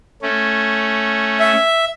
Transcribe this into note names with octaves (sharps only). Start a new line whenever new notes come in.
A3 C#4
E5